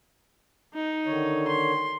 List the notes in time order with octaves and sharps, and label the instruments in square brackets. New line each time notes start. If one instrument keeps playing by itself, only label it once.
[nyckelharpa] D#4
[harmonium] D3 D#3 C#5
[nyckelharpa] C6